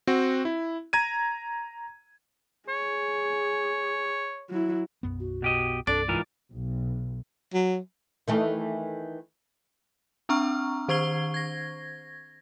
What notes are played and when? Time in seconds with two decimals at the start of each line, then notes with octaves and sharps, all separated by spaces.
0.07 C4 F#4
0.45 E4
0.93 A#5 G#6 D#7
2.69 G#4 C#5
4.50 F#3 E4
5.03 B1 F#2 B3
5.20 F#4
5.42 B2 G4 D#5
5.87 C2 G2 C4 D4 A4 D5
6.08 G#2 E3 F4 A#4
6.50 B1
7.54 F#3
8.28 D#3 E3 A3
10.29 C4 D4 A#5 C#6 F6
10.88 D#3 C5 C#6 G#6 C7 G7
11.34 G#6 A#6